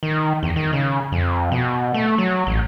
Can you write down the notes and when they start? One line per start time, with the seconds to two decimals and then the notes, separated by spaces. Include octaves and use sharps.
0.03 D#3
0.43 E2
0.56 D#3
0.73 C#3
1.12 F2
1.52 B2
1.94 A3
2.18 F#3
2.47 A1